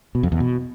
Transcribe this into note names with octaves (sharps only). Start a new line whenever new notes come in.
B2
F2
E2
B2